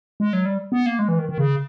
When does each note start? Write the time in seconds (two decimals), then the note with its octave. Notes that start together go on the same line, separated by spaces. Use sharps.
0.20 G#3
0.33 F#3
0.46 G3
0.72 B3
0.86 A#3
0.99 G#3
1.08 E3
1.19 D#3
1.29 D#3
1.38 C#3